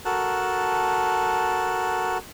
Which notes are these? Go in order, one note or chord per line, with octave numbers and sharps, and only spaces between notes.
F#4 A4 A#4 A5 F#6